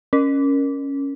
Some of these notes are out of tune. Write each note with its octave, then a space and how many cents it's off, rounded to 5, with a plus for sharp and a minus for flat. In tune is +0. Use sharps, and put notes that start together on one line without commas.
C#4 +0 A#4 +5